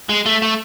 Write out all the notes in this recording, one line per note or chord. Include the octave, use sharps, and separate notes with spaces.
G#3
A3
A3